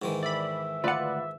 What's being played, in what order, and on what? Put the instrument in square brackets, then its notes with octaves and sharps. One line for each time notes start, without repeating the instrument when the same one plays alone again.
[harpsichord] G#2 D#3 E3
[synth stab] D5 B5 [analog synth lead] E5
[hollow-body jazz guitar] D2 F#5 [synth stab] F4 B4 D5